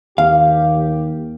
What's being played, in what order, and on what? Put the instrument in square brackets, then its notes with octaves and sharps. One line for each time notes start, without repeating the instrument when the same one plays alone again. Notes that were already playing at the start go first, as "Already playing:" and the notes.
[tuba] D#2 [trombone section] G4 [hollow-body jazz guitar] F5